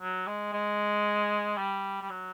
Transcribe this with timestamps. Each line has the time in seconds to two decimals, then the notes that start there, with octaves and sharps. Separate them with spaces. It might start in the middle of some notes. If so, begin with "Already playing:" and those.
0.01 F#3
0.27 G#3
0.53 G#3
1.57 G3
2.01 G3
2.10 F#3